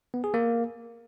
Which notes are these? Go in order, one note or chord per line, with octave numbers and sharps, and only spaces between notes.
B3
G#4
A#3